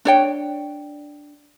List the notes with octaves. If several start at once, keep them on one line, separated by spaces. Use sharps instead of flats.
D4 C#5 G5